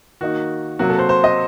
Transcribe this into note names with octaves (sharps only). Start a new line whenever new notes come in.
D#3 A#3 D#4 F#4
C3 F#3 A#3 F#4
A4
C5
C5
D#5